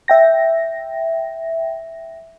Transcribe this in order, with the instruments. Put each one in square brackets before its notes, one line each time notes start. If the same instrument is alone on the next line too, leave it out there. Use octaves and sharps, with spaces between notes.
[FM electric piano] E5 G5 A#6